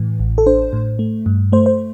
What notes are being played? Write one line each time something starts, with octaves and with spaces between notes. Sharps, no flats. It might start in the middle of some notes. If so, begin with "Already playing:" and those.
Already playing: A2 E3
A1
A4
D4 C5
A2
A3
G2
A3 C5
C5